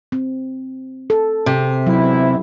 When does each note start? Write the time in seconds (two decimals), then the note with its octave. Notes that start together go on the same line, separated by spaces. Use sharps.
0.12 C4
1.10 A4
1.46 C3
1.86 E2 G#2 F#3 E4